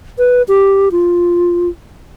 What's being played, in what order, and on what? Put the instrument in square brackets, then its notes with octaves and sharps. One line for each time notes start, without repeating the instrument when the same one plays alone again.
[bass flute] B4
G4
F4